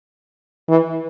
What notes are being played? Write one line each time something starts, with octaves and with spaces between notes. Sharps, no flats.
E3